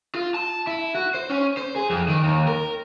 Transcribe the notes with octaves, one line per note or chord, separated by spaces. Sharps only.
F4
A5
E4
F#4
C5
C#4
C5
G#4
F2
D#3
D#2
A#4